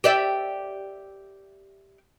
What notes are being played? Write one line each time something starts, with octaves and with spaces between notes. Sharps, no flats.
G4 D5 E5